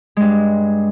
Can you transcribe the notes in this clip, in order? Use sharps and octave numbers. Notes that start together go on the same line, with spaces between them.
G2 G#3